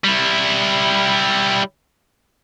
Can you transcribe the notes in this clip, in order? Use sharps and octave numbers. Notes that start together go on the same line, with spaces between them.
G3 E4